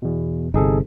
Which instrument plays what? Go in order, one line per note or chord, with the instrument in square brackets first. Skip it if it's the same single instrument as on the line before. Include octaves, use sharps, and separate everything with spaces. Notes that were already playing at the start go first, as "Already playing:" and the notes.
[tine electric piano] E2 B2
[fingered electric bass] G1 C3 [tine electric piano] D#4 G#4 A4